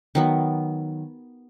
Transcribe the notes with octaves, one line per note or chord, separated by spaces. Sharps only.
D#3 F#3 B3